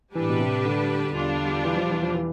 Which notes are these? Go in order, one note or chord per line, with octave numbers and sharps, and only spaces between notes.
A2 E3 G3 D4 G4 B4
B2
C3
D3
E2 B2 G3 D4 F4
E3
F3
E3
F3
E3